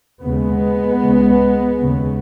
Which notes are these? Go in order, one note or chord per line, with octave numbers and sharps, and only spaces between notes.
D#2 C#3 G#3 B3
C#2 C#3
D#2 C#3